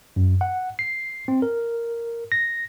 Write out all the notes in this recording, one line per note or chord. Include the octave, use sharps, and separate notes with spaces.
F#2
F#5
C7
C4
A#4
A#6